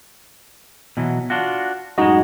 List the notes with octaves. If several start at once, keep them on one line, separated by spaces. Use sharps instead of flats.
B2 E3 F#3
D4 F4 F#4
F#2 A2 G#3 D#4 F#4 D#5